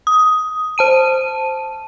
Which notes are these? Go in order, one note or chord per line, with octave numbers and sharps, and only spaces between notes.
D#6
C5 A5 D#7